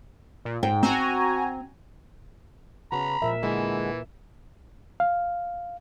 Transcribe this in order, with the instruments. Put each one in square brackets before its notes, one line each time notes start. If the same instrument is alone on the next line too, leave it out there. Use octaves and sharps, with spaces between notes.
[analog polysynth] A#2
[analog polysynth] G#2 [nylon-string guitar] G5
[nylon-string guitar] C4 [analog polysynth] F#4 G#5 A#5
[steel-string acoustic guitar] C#3 B3 F#4 [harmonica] A#5 B5
[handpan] A#2 A#4 E5 [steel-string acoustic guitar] F3 G#3
[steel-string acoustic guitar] D3 G#3 B3 [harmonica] E3
[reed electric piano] F5